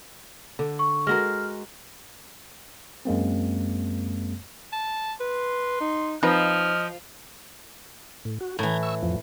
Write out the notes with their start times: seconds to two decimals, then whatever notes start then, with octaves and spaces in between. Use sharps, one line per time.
0.59 D3
0.79 C#6
1.07 G#3 F#4 A#4 F6
3.05 F#2 G#3 A#3 C4
4.72 A5
5.20 B4 C6
5.80 D#4
6.23 F3 C4 D#4 B4 D#5 F6
8.25 A2
8.40 F#4
8.59 A2 E3 A#5 G6 G#6
8.83 C#6 E6
9.03 F2 F3